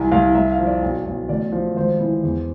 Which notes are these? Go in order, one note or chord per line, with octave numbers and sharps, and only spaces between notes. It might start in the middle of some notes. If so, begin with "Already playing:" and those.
Already playing: C2 E3 G#5
C2 F5
C2 E5
F5
F3
D5
B1
B1
A1 D5
F3
G#1 C5
E3
E2